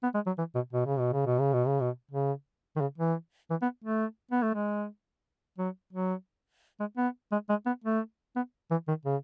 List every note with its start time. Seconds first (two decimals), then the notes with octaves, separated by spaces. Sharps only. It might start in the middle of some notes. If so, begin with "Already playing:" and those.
0.03 B3
0.14 G#3
0.26 F#3
0.38 E3
0.55 B2
0.73 B2
0.86 C#3
0.99 B2
1.13 C#3
1.26 B2
1.40 C#3
1.53 B2
1.67 C#3
1.80 B2
2.11 C#3
2.76 D#3
2.81 C#3
2.98 E3
3.50 E3
3.62 B3
3.84 A3
4.32 B3
4.43 A3
4.55 G#3
5.58 F#3
5.93 F#3
6.80 G#3
6.97 B3
7.32 G#3
7.49 G#3
7.66 B3
7.84 A3
8.36 B3
8.71 E3
8.88 D#3
9.05 C#3